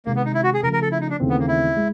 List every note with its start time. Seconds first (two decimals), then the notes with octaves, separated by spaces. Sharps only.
0.06 C3 D#3 G#3 A#3
0.16 B3
0.25 D#4
0.34 E4
0.43 F#4
0.54 G#4
0.63 C#3 F3 A3 A#4
0.73 A#4
0.82 A4
0.92 E4
1.01 D#4
1.10 D4
1.20 D#2 C#3 E3 A3 C4
1.30 B3
1.39 A#3
1.48 E4
1.77 G#3